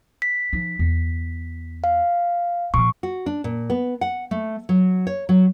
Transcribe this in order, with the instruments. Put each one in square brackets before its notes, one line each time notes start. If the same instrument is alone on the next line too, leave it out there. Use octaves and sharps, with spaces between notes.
[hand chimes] B6
[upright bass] F3 D#4
E2
[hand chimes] F5
[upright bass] A#2 F3 [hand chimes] C#6
[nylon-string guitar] F#4
D4
A#2
B3
F#5
A3
F#3
C#5
F#3